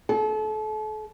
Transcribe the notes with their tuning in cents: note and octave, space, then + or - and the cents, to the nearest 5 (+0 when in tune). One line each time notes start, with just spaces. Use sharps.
A4 -35